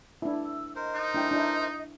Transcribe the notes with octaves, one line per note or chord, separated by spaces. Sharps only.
D4 E4
E6
A#4 C5 D#5
D#4
D4 E4 G5
D4 E4